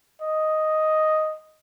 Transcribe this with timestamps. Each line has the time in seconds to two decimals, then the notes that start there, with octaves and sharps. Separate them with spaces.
0.22 D#5